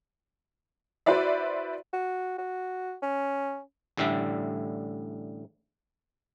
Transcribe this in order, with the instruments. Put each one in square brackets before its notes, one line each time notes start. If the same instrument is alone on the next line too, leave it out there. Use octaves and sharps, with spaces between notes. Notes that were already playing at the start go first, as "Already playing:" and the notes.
[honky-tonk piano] E4 F#4 B4 C5 D5 E5
[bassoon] F#4
F#4
C#4
[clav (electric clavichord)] A1 A2 D3 G3 E5